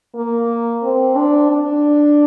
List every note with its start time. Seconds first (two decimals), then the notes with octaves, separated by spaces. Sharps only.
0.15 A#3
0.83 C4
1.17 D4
1.51 D4